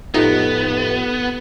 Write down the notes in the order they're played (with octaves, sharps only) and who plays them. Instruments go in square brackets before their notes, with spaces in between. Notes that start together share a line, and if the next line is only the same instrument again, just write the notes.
[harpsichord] F2 A2 [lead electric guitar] B3 [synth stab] D#4 [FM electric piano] F4 G4 E5